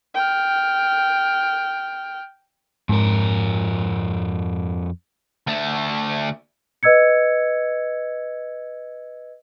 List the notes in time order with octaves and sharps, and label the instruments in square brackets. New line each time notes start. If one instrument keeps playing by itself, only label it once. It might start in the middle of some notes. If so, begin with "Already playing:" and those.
[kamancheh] G5 F6
[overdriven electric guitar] F2 A#4 [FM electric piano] G#2
[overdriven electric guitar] D2 A3
[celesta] B4 D#5 E6 G#6 C#7